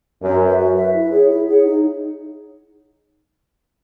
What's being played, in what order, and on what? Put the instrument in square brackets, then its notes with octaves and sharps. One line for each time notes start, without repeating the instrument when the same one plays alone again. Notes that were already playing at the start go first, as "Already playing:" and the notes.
[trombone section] F#2 [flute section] F#4
[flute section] B4 E5
F#4
B4 E5
E4
G#4 C#5 F#5
E4
G#4 C#5 F#5
D#4